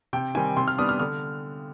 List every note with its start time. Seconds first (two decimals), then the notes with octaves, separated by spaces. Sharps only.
0.13 C3 G5
0.35 D#3 G3 C4 G#5
0.57 C3 C6
0.68 F6
0.78 G3 B3 D4 D#6
0.89 F6
1.00 D3 F6